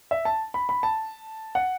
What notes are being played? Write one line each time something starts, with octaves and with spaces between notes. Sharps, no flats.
E5
A5
B5
B5
A5
F#5